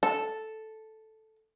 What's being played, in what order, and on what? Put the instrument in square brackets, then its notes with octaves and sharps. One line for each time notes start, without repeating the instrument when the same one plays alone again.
[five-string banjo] A4